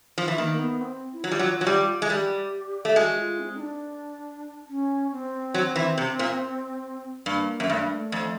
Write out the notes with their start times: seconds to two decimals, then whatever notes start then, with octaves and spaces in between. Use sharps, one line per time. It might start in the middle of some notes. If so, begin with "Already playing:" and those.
0.18 F3
0.28 E3
0.38 D#3 A#3
0.53 A#3
0.59 B3
0.81 C4
1.13 E4
1.23 F#3 F4
1.31 G3
1.39 F#3
1.61 F#3
1.67 G3
2.02 G#3
2.10 G3 G4
2.85 A3
2.96 G#3 F#4
3.18 F4
3.40 C4
3.56 D#4
3.60 D4
4.69 C#4
5.12 C4
5.54 F#3
5.76 E3
5.98 C3
6.19 A#2
7.26 G2 A#3
7.60 F#2
7.69 G2 A3
7.80 A#3
7.93 A3
8.12 F2